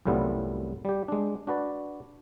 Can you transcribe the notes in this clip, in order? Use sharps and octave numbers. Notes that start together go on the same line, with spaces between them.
C2 F#2 A2 G3 B3 F4
G3 G4
G#3 D4
D4 F#4 B4 D5